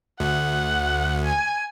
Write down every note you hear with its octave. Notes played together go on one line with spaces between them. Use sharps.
D2 F#5
G#5